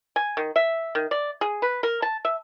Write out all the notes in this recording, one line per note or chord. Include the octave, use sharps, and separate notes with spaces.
G#5
D#3
E5
D#3
D5
G#4
B4
A#4
A5
E5